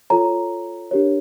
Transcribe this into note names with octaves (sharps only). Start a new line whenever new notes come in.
F4 A4 C#5 A#5
D4 G4 A#4 C#5